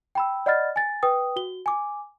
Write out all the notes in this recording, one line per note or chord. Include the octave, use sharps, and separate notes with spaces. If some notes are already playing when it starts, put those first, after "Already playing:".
G5 B5 E6
D5 D#5 F#5 B5 F6 A6
G#5 A6
B4 G5 D#6
F#4 G7
G#5 D6